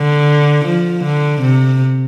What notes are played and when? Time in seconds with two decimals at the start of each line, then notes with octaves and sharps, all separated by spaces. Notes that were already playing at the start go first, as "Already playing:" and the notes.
Already playing: D3
0.65 F3
1.04 D3
1.42 C3